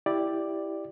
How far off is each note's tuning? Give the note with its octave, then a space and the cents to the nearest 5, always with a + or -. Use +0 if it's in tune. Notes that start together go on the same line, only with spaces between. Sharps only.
E4 +0 G4 +0 D5 +5